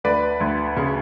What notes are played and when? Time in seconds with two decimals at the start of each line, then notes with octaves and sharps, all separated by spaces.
0.04 D2 B4 D5
0.40 D2
0.77 C#3